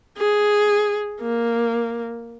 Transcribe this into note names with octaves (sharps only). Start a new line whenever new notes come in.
G#4
A#3